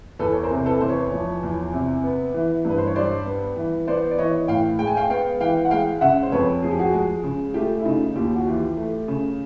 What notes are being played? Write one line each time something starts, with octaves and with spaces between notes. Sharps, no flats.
E2 A4 B4
C#5
A#4 C5
C3
A4 B4
E2 C5
B4 C#5
F3
E2
C3
B3
E3
G2 B4
C5
C#5
G3 C5 D5
B3
E3
B3 C5 D5
D5
E3 C#5 D#5
A2 F5 G5
G#3 G5
G#5
F5 G5
B3 F5 G5
E3 F5 G5
F#5
G#3 F5 G5
C#3 E5 F#5
C5
F2 B4 C#5
F3 G#4
G4
F#4 G#4
G#3
C#3
A3 F4 G4
E4
C#3 D#4 F4
D#2 F4 G4
F#4
E3 F4 G4
A3
C#3